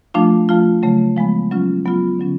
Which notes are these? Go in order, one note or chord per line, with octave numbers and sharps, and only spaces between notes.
F3 A3 D4 F4
F3 A3 F4
C#3 F#3 A3
F3 G#3 B3
F#3 C#4 F4
F#3 B3 F4
D3 F#3 C#4